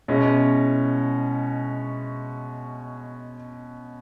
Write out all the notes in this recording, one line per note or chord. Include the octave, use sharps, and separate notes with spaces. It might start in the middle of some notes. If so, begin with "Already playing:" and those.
B2 G#3 C#4 E4